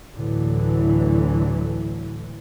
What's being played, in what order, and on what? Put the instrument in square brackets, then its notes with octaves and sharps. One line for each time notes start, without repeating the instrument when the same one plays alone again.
[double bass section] D2 A2 D3 E3 F#3